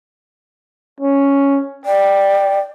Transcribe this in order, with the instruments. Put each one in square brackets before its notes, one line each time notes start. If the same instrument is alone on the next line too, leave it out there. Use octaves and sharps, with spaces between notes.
[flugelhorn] C#4
[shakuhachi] D5 [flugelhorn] G5